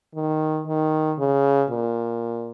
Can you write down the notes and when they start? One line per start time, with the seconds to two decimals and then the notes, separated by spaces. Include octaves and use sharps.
0.15 D#3
0.67 D#3
1.18 C#3
1.70 A#2